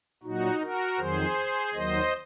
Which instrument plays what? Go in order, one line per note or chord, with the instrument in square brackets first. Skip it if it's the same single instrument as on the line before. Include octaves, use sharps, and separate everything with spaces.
[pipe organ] A#2 F#3 D#4 F#4
F#4 A#4
F2 D#3 F#3 G#4 C5
D#2 D#3 F#3 C5 D#5